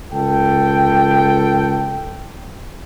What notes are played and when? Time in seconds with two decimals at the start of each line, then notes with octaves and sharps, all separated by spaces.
0.12 C#2 A4 G5